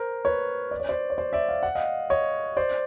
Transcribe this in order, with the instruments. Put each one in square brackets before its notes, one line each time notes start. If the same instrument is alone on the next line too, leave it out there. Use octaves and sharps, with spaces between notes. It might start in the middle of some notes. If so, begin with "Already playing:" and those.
Already playing: [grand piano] A#4 C5
B4 C#5
D5
C#5
C5 D5
C#5
C5 D5
D5 E5
F5
F#5
D#5 F5
C#5 D#5
C5 D5